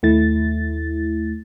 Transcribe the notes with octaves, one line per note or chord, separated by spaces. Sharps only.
D#2 A3 E4 A6